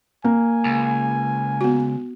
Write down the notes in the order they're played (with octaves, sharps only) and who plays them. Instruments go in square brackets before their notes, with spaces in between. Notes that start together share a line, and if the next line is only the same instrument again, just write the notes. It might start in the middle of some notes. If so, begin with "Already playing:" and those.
[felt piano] A#3 [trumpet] G#5
[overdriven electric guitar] C#2
[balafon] B3 F#4